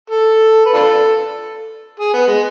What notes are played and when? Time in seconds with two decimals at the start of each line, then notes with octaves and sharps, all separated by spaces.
0.10 A4
0.66 B4
0.74 D4 F4 A4
2.00 G#4
2.14 B3
2.27 G#3